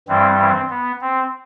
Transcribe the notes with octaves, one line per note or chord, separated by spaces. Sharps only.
G2 E3 G3 C4
C4
B3
C4